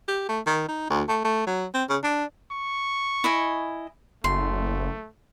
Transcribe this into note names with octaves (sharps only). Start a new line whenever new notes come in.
G4
A3
D#3
D#4
D2
A3
A3
F#3
C4
C#3
D4
C#6
E4 D#5 G#5
F#1 A3 C6